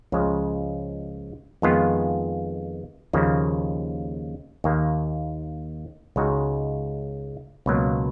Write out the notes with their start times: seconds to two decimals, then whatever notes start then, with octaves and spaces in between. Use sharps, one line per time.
0.12 C#2 C#3 F3 G#3
1.62 F2 D#3 G#3 B3 F4
3.13 D#2 C#3 F3 A#3
4.64 D#2 D#3 A#3
6.16 C#2 C#3 G#3 D#4 F#4
7.66 C#2 B2 F#3 A#3